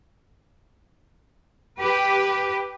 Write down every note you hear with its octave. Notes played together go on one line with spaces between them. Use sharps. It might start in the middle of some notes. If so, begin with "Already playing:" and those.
G4 B4